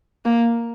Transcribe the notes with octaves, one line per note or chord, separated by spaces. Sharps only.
A#3